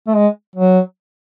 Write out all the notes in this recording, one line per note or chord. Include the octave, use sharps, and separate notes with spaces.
A3
G#3
F#3